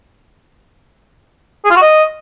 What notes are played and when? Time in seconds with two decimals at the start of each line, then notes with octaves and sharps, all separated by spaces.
1.65 G#4
1.70 F4
1.76 F#4
1.82 D#5